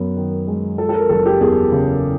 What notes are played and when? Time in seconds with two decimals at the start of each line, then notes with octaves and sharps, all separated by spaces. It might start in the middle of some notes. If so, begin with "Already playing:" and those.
Already playing: F#2 B3
0.17 D#3
0.47 G#3
0.78 F3 A4
0.89 A4
0.94 A#4
1.09 F#1 A4
1.26 G4
1.41 E2 G#4
1.72 C#3